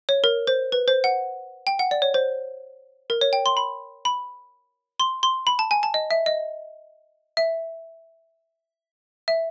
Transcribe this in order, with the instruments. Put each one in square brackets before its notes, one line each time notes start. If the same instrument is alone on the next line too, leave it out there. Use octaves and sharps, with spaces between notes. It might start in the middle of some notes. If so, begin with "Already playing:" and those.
[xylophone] C#5
A#4
C5
B4
C5
F#5
G5
F#5
D5
C#5
C5
A#4
C#5
G5
C6
B5
B5
C6
C6
B5
A5
G#5
A5
D#5
E5
D#5
E5
E5